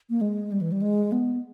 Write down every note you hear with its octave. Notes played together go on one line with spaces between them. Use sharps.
A#3
G#3
G3
E3
G3
G#3
B3